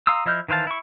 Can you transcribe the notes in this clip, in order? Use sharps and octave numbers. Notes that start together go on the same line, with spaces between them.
F5 A#5 C6 D#6 E6
F3 E4 D#5 F6 G6
D#3 E3 C5 F5 A5
E4 C#6